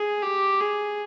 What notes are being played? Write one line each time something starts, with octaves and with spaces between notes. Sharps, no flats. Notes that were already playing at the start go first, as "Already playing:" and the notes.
Already playing: G#4
G4
G#4